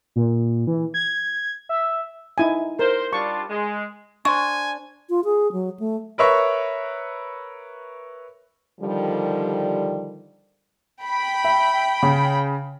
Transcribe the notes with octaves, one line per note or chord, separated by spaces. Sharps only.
A#2
E3
G#6
E5
D#4 E4 G#5
A#4 C5
G3 D4 F4 C#6
G#3
D4 C5 G#5 C#6
F4
G#4
F#3
A3
A#4 B4 C#5 E5 C#6
D3 D#3 F3 G3
G5 B5
E5
C#3